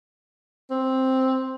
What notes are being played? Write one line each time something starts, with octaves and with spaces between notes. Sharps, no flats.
C4